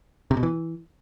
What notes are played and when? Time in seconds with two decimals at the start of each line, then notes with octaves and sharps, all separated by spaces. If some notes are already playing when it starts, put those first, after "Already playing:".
0.31 C3
0.37 B2
0.43 E3